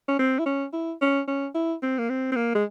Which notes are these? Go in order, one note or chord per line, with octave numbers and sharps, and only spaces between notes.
C#4
C4
E4
C#4
E4
C#4
C#4
E4
C4
A#3
C4
C4
A#3
G#3